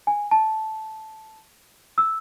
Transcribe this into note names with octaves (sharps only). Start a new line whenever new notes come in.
G#5
A5
E6